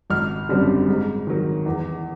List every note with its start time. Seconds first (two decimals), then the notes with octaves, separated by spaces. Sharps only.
0.10 G#1 F6
0.49 F#2 D3 G3 C4
0.88 G#2
1.27 D#3 F#3
1.66 E2